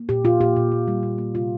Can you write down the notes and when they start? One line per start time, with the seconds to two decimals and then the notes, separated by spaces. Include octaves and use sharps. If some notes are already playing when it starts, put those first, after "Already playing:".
Already playing: A#3
0.09 A#2 G4
0.25 A#2 F4
0.41 A#2 G4
0.56 A#2
0.72 A#2
0.88 G3
1.03 A#2
1.18 A#3
1.35 C3 F4